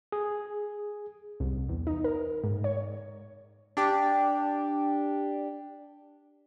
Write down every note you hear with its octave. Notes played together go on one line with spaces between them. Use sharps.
G#4
C2
E2
D#4
A#4
G#2
C#5
D4 G4